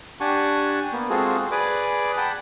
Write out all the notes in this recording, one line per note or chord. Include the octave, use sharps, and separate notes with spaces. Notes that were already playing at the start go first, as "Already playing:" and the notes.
D4 G4 F#5 G#5 A5 C#6
A#3 B3
G#3 C4 F4 F#4 G#4 A4
G#4 B4 D5 G#5 D6
F#5 G5 A5 B5